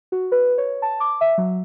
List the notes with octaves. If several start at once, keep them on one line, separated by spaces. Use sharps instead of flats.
F#4
B4
C#5
A5
D6
E5
F#3